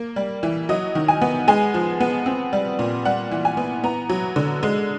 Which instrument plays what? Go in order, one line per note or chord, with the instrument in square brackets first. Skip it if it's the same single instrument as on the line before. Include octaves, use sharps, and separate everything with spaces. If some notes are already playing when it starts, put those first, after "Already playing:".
Already playing: [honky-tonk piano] A#3
G3
E3
F#3 D#5
D#3
G#5
B3
G#3 G#5
F3
B3
C4
G3
A#2
G3 F#5
E3
G#5
B3
B3 A#5
F#3
D3
G#3